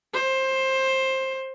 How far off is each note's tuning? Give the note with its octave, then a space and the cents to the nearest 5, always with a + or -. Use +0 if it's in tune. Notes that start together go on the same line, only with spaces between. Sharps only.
C5 +15